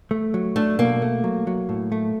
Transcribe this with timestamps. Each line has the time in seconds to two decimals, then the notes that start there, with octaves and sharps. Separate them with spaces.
0.11 A3
0.34 F#3
0.56 A3 D4
0.79 B2 A#3
1.02 A3
1.24 F#3
1.47 F#3
1.69 A2
1.92 A3